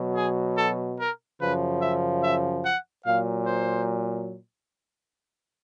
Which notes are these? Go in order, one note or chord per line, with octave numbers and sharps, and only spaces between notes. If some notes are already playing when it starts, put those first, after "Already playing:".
Already playing: B2 F#3
G#4
A4
A#4
F#2 C#3 F3 B4
E5
E5
F#5
A#2 F#3 F5
C5